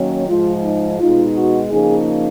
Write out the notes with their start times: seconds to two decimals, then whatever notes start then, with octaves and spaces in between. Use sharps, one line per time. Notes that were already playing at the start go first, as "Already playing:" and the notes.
Already playing: D#3 F#3 A#3 C#4
0.28 G#2 F3 G#3 F4
0.64 D#4
0.99 B2 G#3 D#4 F4
1.35 F#4
1.70 C#3 F3 A#3 D#4 G#4